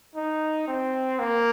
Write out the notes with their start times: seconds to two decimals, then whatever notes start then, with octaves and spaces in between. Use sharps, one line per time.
0.16 D#4
0.67 C4
1.19 A#3